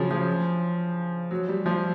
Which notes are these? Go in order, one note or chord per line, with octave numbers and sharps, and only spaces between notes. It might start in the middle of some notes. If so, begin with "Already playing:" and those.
Already playing: C#3 F3 F#3
F3
F#3
G3
F3